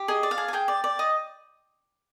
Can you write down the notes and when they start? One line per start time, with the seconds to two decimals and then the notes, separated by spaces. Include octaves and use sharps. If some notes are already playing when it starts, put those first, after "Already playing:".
Already playing: G4
0.08 G#4 D#5
0.23 D5
0.31 F5
0.38 G#4
0.48 G#5
0.53 G#4 G5
0.68 D5
0.84 D5
0.99 D#5